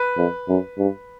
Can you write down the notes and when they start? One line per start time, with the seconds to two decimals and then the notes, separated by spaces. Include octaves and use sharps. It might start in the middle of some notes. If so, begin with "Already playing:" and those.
Already playing: B4
0.17 F2
0.49 F#2
0.78 G2